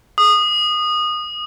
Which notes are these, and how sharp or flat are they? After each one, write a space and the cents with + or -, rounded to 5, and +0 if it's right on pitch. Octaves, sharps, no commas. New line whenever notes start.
D#6 -20